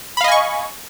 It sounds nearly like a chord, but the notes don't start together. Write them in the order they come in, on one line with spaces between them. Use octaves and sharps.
B5 F5 D#5 G#5 C#6